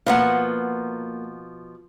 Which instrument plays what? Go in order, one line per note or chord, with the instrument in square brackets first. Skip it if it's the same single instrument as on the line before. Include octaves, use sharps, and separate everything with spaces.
[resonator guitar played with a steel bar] B2 F3 F#5 [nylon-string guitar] A#3 B4 F5